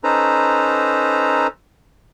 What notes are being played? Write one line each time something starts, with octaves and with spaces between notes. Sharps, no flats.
C#4 D#4 A4 B4 C5 A#5